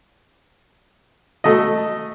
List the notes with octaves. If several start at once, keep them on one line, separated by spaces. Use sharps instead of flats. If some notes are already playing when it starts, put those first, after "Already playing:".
A3 D#5